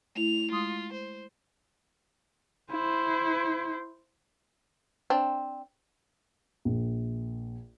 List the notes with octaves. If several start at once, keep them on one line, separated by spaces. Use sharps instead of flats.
A3 E4 F7
G#3 F4 C6 D#6
C5
E4 C5
C4 D4
A#1